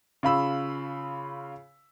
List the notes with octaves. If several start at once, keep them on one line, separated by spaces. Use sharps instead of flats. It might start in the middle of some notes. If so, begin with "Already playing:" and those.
C#3 F4 B5 E6